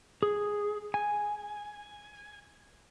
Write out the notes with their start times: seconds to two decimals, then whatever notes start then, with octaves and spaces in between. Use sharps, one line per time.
0.23 G#4
0.94 G#5